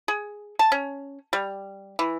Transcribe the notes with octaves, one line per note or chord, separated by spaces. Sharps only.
G#4
A5
C#4
G3
E3